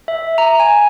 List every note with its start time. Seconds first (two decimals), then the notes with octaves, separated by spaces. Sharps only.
0.08 E5
0.38 A#5
0.60 G#5